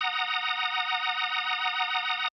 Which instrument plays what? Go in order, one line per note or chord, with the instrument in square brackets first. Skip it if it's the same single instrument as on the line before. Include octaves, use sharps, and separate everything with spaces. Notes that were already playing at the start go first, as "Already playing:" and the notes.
[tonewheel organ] F#5 A#5 D#6